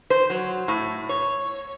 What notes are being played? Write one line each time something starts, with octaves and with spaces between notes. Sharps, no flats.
C5
F#3
A2
C#5